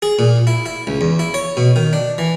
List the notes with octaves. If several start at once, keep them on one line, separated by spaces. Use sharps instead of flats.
G#4
A#2
E4
E4
C#2
E2
E4
C#5
B2
D#3
D4
E3